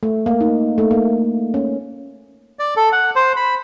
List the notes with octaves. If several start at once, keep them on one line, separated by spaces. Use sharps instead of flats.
A3
A#3
D#4
A3
A#3
C#4
D5
A4
F#5
C5
B5